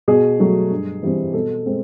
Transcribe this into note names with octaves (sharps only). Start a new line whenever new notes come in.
B2 G#4
F#3 A3
G2
E3 G3 C4
B2 A4
G#3 C4